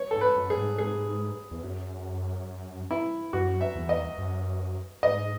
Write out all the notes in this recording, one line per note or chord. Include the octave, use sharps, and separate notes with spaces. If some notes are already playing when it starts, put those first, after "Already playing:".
Already playing: C#5
G#2 A4
B4
F#2
G#4
G#2
G#4
E2
F#2
E4
F#2 F#4
E5
E2
D#5
F#2
G#2 D#5